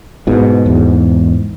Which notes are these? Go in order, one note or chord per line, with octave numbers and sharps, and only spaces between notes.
G#2 B2
E2 G#2